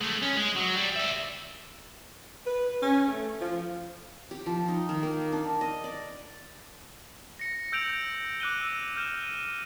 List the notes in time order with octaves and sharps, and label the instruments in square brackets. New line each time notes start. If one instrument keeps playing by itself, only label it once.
[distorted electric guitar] G#3 A3
C#4
G#3
F#3
G3
D5 E5
[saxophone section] B4
C#4
A3
F3
[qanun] G4
F3
D#4
D#3
A#3
D4
D#5
D5
[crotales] A#6 C#7
E6 G6 D7 F7 F#7
D6 F#6 D#7 G7
E6
F6 G6 E7
D#7